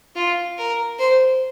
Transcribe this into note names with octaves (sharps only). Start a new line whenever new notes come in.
F4
A#4
C5